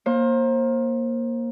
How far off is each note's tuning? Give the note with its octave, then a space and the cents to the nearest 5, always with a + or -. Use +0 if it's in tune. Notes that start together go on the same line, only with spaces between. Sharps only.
A#3 +10 C5 +30